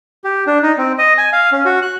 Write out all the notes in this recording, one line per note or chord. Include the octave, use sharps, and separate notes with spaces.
G4
D4
D#4
C4
D#5
G#5
F5
C#4
F#4
F#6